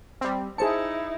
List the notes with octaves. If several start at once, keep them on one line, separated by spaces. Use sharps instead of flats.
G3 C4
D#4 E4 G#4 C5 A5 C#7